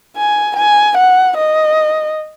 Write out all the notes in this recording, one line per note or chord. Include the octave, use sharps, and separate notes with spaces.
G#5
G#5
F#5
D#5